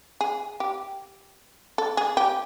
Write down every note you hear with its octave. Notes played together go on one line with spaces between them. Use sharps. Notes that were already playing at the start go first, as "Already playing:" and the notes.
G#4
G4
A4
G#4
G4